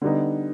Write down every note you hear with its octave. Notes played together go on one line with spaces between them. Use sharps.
D3 G3 B3 D#4